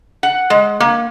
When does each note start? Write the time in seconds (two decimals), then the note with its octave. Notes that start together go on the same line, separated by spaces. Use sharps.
0.23 F#5
0.50 G#3
0.80 A#3